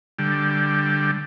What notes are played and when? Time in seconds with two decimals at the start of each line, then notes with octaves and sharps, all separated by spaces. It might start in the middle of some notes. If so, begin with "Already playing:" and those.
0.19 D3 G3